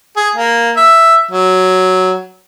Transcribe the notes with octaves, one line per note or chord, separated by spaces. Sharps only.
G#4
A#3
E5
F#3